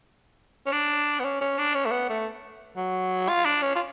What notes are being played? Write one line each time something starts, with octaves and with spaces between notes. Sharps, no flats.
C#4
D4
B3
C#4
C#4
D4
C#4
A3
B3
A3
F#3
F4
D4
C#4
F4